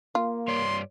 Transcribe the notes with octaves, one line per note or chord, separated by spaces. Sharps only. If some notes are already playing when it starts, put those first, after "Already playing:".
A#3 F4
G2 C#5 D5 C6